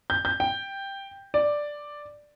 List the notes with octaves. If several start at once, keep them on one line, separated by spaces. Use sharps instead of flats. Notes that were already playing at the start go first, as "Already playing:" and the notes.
G6
G6
G5
D5